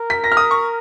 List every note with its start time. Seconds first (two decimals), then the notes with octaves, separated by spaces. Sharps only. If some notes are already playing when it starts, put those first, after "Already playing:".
Already playing: A#4
0.10 B6
0.24 A#6
0.32 F6
0.37 D#6
0.51 C#6